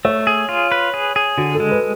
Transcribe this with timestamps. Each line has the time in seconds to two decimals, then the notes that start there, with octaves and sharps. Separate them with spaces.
0.05 A3 C#5
0.27 G#4
0.49 F4
0.72 B4
0.94 G#4
1.16 G#4
1.38 D3 F#4
1.55 A4
1.60 G#3
1.71 B4